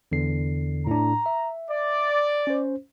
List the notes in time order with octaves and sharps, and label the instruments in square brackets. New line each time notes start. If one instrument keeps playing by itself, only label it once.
[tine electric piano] E2 D3 C7
[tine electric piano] A2 D4 [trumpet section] A#5
[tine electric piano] E5
[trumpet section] D5
[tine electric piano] C#4 C5